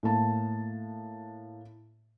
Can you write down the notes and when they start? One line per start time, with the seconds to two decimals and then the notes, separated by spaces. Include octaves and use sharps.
0.03 A2 A#3 A5